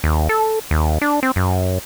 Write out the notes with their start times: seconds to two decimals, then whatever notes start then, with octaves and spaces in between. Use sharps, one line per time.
0.04 D#2
0.29 A4
0.71 D#2
1.01 D4
1.23 C4
1.36 F#2